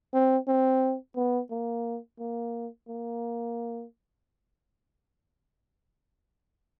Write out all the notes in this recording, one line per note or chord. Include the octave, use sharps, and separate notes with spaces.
C4
C4
B3
A#3
A#3
A#3